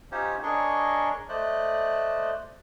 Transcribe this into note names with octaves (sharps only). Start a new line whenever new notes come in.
C#4 D#4 F4 G4 C5 C#5
D4 G#4 A#4 C#5 D#5 C#6
A3 C5 D5 D#5 F#6